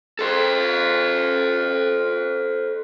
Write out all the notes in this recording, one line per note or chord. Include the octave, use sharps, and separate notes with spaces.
A4 C5